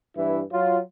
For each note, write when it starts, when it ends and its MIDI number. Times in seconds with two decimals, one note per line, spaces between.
0.17 0.41 43
0.17 0.41 52
0.17 0.41 64
0.53 0.78 54
0.53 0.78 65